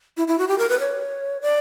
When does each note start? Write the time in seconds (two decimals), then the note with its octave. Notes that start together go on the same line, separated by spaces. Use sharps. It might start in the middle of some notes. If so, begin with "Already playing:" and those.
0.17 E4
0.28 E4
0.38 F#4
0.48 G4
0.58 A#4
0.69 B4
0.79 C#5
1.41 D5